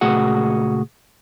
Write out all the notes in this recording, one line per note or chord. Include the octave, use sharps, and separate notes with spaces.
C#2 A#2 A3 F#4 G#4 F#5